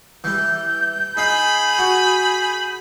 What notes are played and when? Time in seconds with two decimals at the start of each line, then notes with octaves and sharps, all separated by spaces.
0.24 E3 G3 G6
1.17 D#4 G#4 F5 B5
1.79 F#4